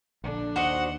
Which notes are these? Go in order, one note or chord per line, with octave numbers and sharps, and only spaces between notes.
A#1 D3 D4
D#2 F#4 C5 D#5 F#5